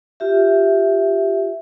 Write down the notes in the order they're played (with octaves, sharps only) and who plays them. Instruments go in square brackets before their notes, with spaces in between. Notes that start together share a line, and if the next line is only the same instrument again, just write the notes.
[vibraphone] F4 G4 E5